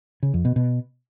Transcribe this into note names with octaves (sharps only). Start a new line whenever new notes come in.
C#3
F2
B2
B2